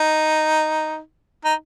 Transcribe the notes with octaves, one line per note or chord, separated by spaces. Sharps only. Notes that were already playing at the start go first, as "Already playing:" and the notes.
Already playing: D#4
D#4